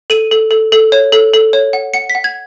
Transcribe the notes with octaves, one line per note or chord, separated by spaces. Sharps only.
A4 D#7
A4
A4
A4
C#5
A4
A4
C#5
F#5
F#5 C#7
B6
F#5
G#6